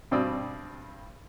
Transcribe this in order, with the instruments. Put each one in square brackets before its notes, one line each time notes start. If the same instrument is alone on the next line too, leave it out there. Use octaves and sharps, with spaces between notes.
[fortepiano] G2 B2 C4 D5 D#6 E6